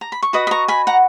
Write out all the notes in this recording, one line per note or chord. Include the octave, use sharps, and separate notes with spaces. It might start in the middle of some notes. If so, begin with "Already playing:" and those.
A#5
B5
C#6
F#4 B4 D#5 B5 D#6
B5
A#5 C#6
G#5 B5
F#5 A#5